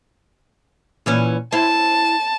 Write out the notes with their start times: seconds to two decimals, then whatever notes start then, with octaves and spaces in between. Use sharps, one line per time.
1.06 A#2 E3 C#4
1.52 E4 C5 A5